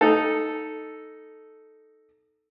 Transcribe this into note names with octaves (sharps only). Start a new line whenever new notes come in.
D#4 A4